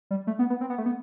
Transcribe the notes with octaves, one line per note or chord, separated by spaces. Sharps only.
G3
A3
B3
B3
C4
B3
A3
B3